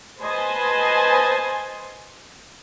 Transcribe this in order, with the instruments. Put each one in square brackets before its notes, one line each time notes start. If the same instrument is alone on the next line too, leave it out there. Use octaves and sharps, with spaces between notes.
[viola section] B4 C5 D#5 G#5 A5 C6